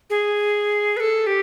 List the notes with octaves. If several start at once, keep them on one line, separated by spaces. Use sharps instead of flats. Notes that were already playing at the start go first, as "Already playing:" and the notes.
G#4
B4
A4
G4